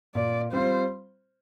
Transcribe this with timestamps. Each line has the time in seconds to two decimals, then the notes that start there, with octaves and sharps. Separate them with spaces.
0.15 A#2 D5
0.52 G3 C4 F4 C5